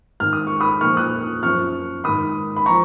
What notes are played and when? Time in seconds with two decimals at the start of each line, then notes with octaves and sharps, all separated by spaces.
0.20 G#2 D#3 F6
0.33 D#6
0.47 C#6
0.60 B5 D#6
0.81 A#2 F3 C#6 F6
0.97 D#6 F#6
1.43 F#2 F3 C#6 F6
2.04 G#2 D#3 B5 D#6
2.56 B5
2.66 F3 A#5 C#6